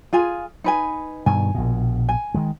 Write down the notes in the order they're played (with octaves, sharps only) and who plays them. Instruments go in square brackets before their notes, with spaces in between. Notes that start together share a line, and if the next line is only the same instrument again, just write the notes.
[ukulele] F4 G#4 G#5
D#4 B4 G#5
[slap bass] G2 B2 D#3 [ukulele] G#5
[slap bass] A#1 B2
[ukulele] G#5
[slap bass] D#3 G#3